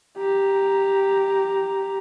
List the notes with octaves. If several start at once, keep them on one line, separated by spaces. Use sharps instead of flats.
G4 A#5